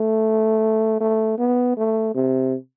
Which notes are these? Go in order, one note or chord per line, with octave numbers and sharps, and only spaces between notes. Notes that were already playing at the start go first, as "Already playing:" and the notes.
Already playing: A3
A3
B3
A3
C3